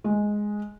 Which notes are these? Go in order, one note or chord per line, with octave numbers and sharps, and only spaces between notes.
G#3